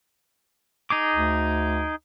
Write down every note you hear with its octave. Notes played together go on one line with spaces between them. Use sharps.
D#4 G#4 D6
D2